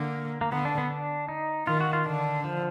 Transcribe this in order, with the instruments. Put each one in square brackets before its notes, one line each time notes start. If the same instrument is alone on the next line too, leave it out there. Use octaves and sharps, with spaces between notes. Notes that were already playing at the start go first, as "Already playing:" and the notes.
Already playing: [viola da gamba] D3 [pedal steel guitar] A#3
[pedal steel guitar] A#3
[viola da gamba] D3 [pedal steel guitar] B3
[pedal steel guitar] D4
B3
D4
D#4
[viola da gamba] D#3 [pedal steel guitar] F4
[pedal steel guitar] F#4
F4
[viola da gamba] D3 [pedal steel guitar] D4
[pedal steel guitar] F3